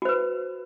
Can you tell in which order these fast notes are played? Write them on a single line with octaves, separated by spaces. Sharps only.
F#4 C5 B4